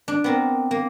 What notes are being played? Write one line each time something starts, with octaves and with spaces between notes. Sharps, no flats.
D4
B3 C4 A#4
A#3